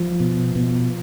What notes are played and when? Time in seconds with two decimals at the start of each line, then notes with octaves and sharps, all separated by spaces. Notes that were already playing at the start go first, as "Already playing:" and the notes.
Already playing: F3
0.20 B2
0.56 B2